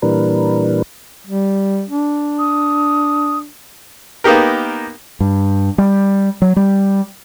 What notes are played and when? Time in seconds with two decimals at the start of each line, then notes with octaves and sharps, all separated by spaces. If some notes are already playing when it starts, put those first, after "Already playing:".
0.02 A#2 E3 G3 D4 A#4 B4
1.27 G3
1.90 D4
2.38 D#6
4.24 A#3 B3 D#4 G4 A#4
5.20 G2
5.78 G3
6.42 F#3
6.56 G3